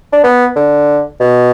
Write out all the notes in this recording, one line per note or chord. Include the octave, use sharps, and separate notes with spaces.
D4
B3
D3
B2